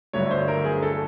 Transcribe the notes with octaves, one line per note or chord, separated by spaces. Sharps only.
G1 G2 D3 F#3 A3 C#5
C5
A#4
G#4
A4